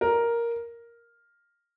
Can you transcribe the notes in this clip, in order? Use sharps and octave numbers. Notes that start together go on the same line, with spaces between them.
A#4